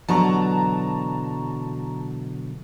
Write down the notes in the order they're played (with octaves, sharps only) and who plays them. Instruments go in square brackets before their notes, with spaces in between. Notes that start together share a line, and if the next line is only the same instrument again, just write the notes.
[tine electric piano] B2 D3 E3 [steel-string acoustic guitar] F#3 [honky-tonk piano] A5 A#5 C#6